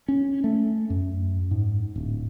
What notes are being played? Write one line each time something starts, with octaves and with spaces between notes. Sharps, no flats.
C#4
A3
F#2
G#2
D1